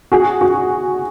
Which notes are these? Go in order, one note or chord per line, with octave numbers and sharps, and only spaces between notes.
F#4 G#4
F#4